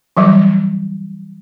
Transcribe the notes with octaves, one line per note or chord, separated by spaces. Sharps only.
E3 F#3 G3